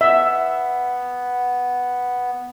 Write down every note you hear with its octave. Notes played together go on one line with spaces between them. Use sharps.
B3 E5